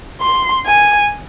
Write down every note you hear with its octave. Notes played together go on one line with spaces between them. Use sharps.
C6
G#5